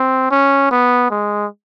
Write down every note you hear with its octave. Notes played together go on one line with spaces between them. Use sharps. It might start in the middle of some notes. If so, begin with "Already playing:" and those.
Already playing: C4
C#4
B3
G#3